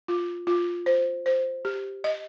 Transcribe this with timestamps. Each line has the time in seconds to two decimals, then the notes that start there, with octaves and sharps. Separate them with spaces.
0.08 F4
0.47 F4
0.86 C5
1.26 C5
1.65 G4
2.04 D#5